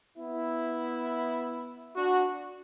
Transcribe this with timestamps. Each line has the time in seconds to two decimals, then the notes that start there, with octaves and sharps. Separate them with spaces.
0.17 B3 E4
1.96 D4 F#4